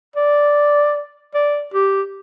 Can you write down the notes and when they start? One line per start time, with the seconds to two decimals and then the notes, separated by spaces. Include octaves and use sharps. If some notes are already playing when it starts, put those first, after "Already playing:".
0.16 D5
1.34 D5
1.74 G4